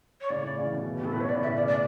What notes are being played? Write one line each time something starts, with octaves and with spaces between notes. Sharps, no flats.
C#5
A2 C#3 D5
A2
C#3 E3
B2
B2
B2 G4
A2 A4
B2 B4
C#5
D5
A2 C#3
E5
A2 C#3 D5
D5